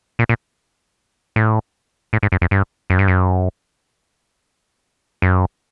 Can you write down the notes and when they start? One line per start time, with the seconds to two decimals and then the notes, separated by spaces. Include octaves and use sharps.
0.19 A#2
0.29 A#2
1.36 A2
2.13 A2
2.23 G#2
2.32 F#2
2.41 F2
2.51 G2
2.90 F#2
2.99 G2
3.08 F#2
5.22 F#2